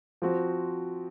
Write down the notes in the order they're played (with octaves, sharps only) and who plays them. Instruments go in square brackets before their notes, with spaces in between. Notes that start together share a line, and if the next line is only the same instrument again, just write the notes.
[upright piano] F3 C4 F#4